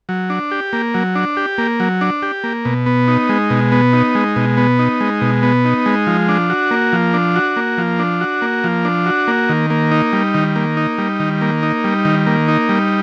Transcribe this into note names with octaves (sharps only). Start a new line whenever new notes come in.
F#3
D4
G4
A#3
F#3
D4
G4
A#3
F#3
D4
G4
A#3
B2
B3
D#4
G#3
B2
B3
D#4
G#3
B2
B3
D#4
G#3
B2
B3
D#4
G#3
F3
D4
F#4
A#3
F3
D4
F#4
A#3
F3
D4
F#4
A#3
F3
D4
F#4
A#3
D#3
A#3
D#4
G3
D#3
A#3
D#4
G3
D#3
A#3
D#4
G3
D#3
A#3
D#4
G3